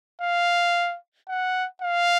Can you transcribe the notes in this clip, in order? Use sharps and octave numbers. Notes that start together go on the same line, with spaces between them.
F5
F#5
F5